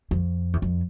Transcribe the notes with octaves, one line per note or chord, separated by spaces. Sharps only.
F2
E2
F2